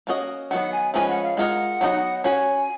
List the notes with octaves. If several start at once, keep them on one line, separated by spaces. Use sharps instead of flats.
A#3 C#4 F#4 B4 D#5
D#3 F#3 B3 F#5
G#5
F3 G#3 C#4 F4 B4 G#5
F#5
F5
G#3 B3 F4 A#4 D#5 F#5
F#3 B3 D#4 F#4
C#4 F#4 C#5 G#5